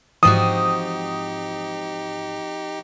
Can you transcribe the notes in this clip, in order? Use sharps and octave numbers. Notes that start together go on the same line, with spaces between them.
G#2 E3 F3 C4 D#4 F#4 G4 D#6